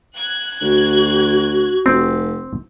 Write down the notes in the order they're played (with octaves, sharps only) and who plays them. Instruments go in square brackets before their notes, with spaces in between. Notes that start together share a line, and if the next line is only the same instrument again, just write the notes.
[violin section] F#6 G#6
[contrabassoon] D2 [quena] F#4
[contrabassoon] F1 [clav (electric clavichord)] C4